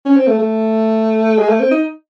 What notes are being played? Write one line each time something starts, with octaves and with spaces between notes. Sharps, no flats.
C#4
C4
A3
A3
G#3
A3
C4
D#4